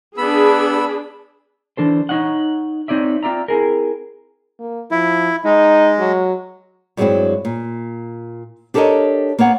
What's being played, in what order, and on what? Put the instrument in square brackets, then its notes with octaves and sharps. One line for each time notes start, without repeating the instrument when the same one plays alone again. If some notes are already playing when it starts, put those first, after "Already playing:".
[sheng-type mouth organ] B3 B5 E6 [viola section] D4 G#4
[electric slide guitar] E3 D4 A4 C5
D#4 C#5 D#5 F#5
C4 D#4 C#5 D5 E5
C4 F4 D5 E5 A#5
C4 E4 G#4 A#4
[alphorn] A#3
[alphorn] F3 [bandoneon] E4
[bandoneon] G#3 [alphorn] D#4
[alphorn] F#3
[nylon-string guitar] G2 F#3 G#3 B3 C4 E4
A#2
D4 G4 A4 A#4 C#5 D#5
A#3 B3 C#5 F#5